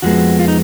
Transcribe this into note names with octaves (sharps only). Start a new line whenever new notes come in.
F2 F3 G#3 B3 F#4
F4
D#4